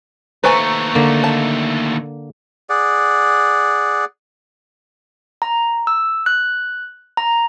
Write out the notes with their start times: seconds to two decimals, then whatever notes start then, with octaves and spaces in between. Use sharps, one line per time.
0.44 D#2 A3 B4 C5 G#5 A#5 C#6
0.95 D3 A#3
1.24 A5
2.70 G#4 D5 F#5
5.42 A#5
5.87 E6
6.26 F#6
7.17 A#5